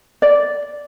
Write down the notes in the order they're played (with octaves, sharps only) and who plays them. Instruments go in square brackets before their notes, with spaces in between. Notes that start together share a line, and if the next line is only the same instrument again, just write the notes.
[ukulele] D5